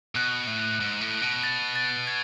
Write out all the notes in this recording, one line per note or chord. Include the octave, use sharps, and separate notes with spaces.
B2 F#6
A2
G#2
A2
B2
A6
A6
G#6